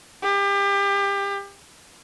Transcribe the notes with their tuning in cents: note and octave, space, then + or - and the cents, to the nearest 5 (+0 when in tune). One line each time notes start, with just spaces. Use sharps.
G4 +30